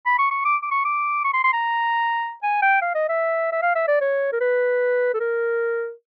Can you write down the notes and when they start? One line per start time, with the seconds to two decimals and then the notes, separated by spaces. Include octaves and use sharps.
0.06 B5
0.19 C#6
0.31 C#6
0.45 D6
0.63 D6
0.71 C#6
0.85 D6
1.24 C#6
1.33 C6
1.44 C6
1.53 A#5
2.43 G#5
2.63 G5
2.82 F5
2.95 D#5
3.09 E5
3.53 E5
3.62 F5
3.75 E5
3.88 D5
4.01 C#5
4.32 A#4
4.41 B4
5.14 A4
5.20 A#4